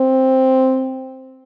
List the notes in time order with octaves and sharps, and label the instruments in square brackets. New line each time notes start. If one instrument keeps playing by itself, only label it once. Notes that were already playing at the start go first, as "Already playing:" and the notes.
Already playing: [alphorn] C4